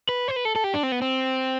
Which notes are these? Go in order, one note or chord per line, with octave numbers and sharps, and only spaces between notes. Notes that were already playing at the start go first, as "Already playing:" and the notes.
B4
C5
B4
A4
A4
G4
D4
C4
B3
C4